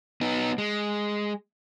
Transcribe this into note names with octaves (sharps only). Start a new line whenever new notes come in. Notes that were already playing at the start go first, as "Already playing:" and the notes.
B3 D#4
G#3